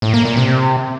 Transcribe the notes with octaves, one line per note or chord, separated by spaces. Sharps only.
A2
A#3
A#2
C3